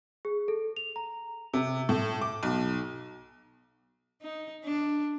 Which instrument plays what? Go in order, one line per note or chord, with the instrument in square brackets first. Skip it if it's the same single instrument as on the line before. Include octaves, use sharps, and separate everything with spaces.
[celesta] G#4
A4
F7
A#5
[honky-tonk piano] C3
A2
D6
B1
[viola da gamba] D#4
D4